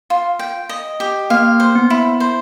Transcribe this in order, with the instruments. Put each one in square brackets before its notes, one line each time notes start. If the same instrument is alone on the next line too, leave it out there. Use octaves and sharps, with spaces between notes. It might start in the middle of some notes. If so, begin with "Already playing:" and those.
[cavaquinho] F4
G5
D#5
G4
[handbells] A#3 [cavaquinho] F5
[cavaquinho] C5
[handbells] B3
[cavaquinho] E4
C5